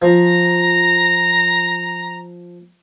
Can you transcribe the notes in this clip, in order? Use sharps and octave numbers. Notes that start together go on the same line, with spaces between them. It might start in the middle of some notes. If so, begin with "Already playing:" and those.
F3 A#5